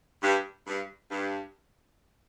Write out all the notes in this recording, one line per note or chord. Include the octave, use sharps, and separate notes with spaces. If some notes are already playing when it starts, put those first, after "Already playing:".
G2
G2
G2